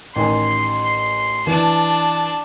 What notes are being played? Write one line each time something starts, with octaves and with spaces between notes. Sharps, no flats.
A1 D#3 G#5 C6
E3 D4 A5